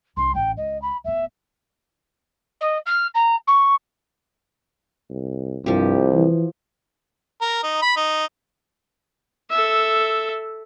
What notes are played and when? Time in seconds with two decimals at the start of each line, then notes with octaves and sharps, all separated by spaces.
0.17 C2 G2 C6
0.35 A1 G5
0.57 C#2 D#5
0.82 B5
1.04 D1 B3 E5
2.60 D#5
2.86 F6
3.14 A#5
3.47 C#6
5.10 C2
5.66 C2 G2 F3 G4
6.13 E3
7.42 A#4
7.63 D#4
7.82 B5
7.97 D#4
9.50 A4 E5